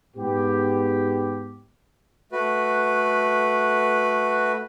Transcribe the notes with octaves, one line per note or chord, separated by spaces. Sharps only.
G#2 B3 G4
A3 F#4 B4